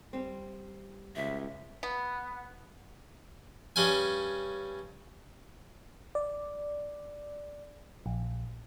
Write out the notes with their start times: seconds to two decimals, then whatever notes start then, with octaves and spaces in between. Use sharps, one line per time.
0.13 G3 C4
1.16 C#2 E5
1.83 B3
3.76 G2 C#4 G#5
6.15 D5
8.06 A#1